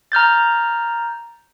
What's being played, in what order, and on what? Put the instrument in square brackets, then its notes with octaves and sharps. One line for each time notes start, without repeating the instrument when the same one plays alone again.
[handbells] A#5 F6 G6 A6